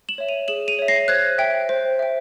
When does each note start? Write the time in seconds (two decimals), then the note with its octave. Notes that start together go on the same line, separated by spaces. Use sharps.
0.09 E7 F#7
0.18 C#5 E5
0.28 D#7 F7
0.48 G#4 E7 F#7
0.68 D#7 F7
0.79 C#5 E5
0.88 A#6 C7
1.08 C5 F#6 G#6
1.38 E5 G5
1.69 C5
1.99 E5 G5